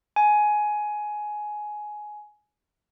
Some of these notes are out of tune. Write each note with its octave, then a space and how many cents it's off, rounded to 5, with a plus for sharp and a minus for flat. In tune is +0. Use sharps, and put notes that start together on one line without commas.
G#5 +15